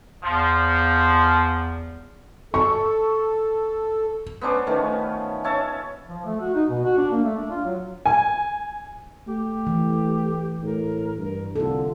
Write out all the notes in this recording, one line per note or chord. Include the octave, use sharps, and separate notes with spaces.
E2 F3
A4 C#6
B3 C#4 D4 C5
D#3 F3 A3 C#4
C#4 C#5 E5 A5
F3
A3
F#4
D#4
B2
F#4
D4
A#3
A3
D4
F4
F#3
G#5
A3 G4
E3
A2 A#4
G2 A#4
C2 D3 F4 A4